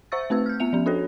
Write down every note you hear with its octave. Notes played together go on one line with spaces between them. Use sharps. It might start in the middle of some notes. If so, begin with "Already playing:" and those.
C5 E5 C#6 E6 A6
A3 C4 B4 E6
F6 G6
B3 E5 F7
F3 C#4
D4 F#4 A4 C#5